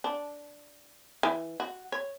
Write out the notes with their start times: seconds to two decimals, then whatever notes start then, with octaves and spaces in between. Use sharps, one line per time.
0.04 D4
1.23 E3
1.60 F#4
1.92 C#5